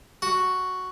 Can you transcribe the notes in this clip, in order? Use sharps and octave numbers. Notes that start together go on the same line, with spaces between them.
F#4